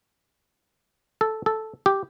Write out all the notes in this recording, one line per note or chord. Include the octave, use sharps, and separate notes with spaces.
A4
A4
G4